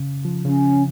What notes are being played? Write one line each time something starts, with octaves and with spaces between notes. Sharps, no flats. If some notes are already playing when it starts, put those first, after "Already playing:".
Already playing: C#3
F3
C#3 C#4